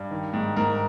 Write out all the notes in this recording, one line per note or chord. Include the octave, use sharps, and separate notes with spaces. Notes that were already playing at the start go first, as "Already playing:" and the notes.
Already playing: G2
D#3
G#2
G#2 A#4